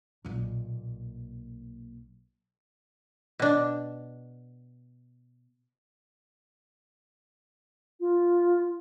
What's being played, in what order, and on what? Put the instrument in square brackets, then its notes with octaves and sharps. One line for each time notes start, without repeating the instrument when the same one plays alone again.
[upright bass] B1 A#2
[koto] B2 D4
[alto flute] F4